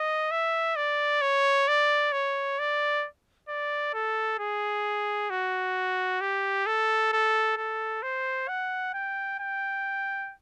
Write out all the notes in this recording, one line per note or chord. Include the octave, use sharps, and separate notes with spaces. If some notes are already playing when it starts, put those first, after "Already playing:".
Already playing: D#5
E5
D5
C#5
D5
C#5
D5
D5
A4
G#4
F#4
G4
A4
A4
A4
C5
F#5
G5
G5